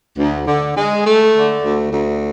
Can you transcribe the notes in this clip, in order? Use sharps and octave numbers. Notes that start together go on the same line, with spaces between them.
D2
D3
G#3
A3
D3
D2
D2